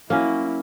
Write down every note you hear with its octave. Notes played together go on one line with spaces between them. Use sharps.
F#3 A#3 C#4 E4